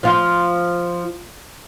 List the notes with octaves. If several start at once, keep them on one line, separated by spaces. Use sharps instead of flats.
F3 F4